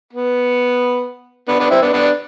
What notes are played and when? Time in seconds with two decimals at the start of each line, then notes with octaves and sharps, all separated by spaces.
0.13 B3
1.48 B3 D4
1.60 B3 D4
1.70 C4 E4
1.82 B3 D4
1.93 B3 D4